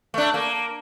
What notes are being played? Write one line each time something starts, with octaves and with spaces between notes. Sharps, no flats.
A3 D4
A#3